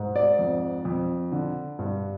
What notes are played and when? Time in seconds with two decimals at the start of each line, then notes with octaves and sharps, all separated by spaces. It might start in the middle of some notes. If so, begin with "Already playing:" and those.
Already playing: G#2
0.16 D5
0.39 F2
0.85 F2
1.32 D3
1.79 G2